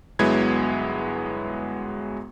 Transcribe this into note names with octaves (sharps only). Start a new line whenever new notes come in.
G1 F#3 G#3 B3 E4 G#6